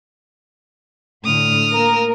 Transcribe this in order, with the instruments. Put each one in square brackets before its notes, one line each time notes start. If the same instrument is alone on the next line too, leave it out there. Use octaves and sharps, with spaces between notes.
[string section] A2 D3 [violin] D#6 F6
[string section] A#3 A#4